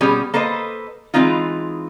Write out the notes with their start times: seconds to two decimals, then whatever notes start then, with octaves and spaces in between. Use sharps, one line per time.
0.01 B2 G3 C#4 G4 G#4
0.34 A#3 A4 B4 C5 D#5
1.14 E3 G#3 C4 D#4 F4